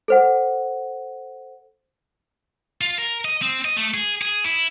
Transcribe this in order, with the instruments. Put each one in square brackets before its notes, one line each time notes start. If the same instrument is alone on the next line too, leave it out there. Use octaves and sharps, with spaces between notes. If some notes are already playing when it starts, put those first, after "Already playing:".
[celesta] A4 C5 F#5
[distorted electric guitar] F4
A#4
D#5
C4
D#5
A3
G#4
G#4
E4